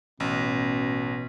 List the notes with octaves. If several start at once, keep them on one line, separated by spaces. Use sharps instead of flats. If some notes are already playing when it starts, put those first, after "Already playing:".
A1 B2 C#4